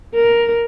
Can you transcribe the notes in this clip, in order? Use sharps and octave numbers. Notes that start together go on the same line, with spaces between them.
A#4